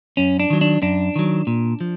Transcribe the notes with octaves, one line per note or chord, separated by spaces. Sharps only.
F#2 C#4
D4
D#3 F#3
D4
F#2 D4
D#3 F#3
A#2
F3